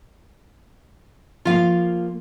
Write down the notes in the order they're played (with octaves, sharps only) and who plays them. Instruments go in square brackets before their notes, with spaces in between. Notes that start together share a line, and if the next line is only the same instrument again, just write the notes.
[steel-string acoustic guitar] F3 A#3 [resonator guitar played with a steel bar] F4 F5